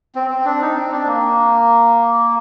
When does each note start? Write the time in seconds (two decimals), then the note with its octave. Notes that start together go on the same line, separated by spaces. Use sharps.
0.15 C4
0.30 C4
0.45 D4
0.61 D#4
0.76 C4
0.92 D4
1.06 A#3